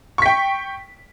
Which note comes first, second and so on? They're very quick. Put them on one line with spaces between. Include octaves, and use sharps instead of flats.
C#6 B6 G5